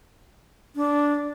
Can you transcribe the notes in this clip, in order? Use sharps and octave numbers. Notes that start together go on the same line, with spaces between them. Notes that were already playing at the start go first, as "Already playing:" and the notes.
D4